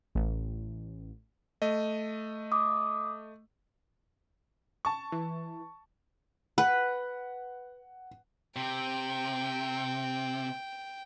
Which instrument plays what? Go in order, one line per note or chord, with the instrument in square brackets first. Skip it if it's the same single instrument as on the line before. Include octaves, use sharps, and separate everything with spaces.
[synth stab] A1
[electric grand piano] A3 D#5
[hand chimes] D6 D#6
[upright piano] A5 C#6
[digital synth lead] E3
[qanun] B4 [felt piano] F#5
[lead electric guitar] C3 [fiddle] G5